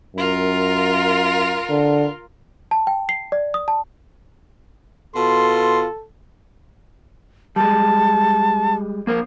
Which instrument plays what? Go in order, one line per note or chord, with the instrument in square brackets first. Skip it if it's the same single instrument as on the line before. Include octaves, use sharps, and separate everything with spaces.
[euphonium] F#2 [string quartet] F4 A#4
[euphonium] D3
[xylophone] A5
G5
C7
D5
D#6
A5
[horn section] B2 F4 C6 [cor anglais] A4
[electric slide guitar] G3 G#3 [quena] A5
[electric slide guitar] A#3 A#4 C5